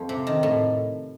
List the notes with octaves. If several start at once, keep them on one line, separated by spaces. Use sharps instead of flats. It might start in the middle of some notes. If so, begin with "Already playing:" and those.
Already playing: F2
C3
D#3
A2